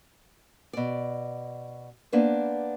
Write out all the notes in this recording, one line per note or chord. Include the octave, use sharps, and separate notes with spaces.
B2 D5
A#3 B3 D4 B4 C5